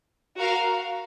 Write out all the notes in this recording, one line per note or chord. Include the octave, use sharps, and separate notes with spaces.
F#4 A#4 F5